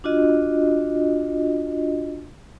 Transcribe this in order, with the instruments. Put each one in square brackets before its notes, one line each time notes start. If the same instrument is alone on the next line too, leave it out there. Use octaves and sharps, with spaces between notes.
[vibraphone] D4 F4 F#4 D#5